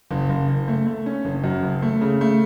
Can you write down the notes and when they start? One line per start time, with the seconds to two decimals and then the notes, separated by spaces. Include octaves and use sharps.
0.11 F#1
0.29 F#1
0.48 F#1
0.68 A3
0.86 A3
1.06 C#4
1.25 F#1
1.44 F#2
1.63 F#1
1.82 A3
2.01 C#3
2.21 A3